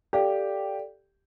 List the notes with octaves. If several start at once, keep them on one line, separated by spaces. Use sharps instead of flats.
G4 A4 D5 F5